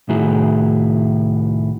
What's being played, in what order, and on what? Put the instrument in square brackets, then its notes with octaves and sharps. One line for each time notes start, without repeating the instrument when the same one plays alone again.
[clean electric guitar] C2 A2 D#3 E4 F#4 G#4